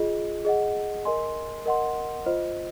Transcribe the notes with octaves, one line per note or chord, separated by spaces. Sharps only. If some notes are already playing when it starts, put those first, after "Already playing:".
Already playing: F4 G#4 D#5
G#4 D#5 F#5
A#4 D#5 G#5 C6
A#4 D#5 F#5 C6
F4 C5 D#5